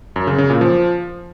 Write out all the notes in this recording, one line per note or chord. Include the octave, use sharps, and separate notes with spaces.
F#2
C#3
C#3
A#2
F3